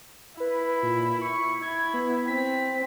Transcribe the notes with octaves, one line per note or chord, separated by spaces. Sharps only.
E4 B4
A#2
C#6
E4 G#6
B3
C4 B6